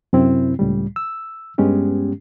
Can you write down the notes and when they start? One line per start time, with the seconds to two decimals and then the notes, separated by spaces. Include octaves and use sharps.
0.13 F#2 C3 C4 E4
0.59 C#2 A2 G3
0.96 E6
1.58 G2 G#3 B3 C#4 G4